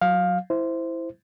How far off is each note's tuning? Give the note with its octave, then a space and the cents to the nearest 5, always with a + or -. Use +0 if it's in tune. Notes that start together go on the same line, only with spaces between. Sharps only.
F#3 -10 F5 +15
E4 +0 C5 -10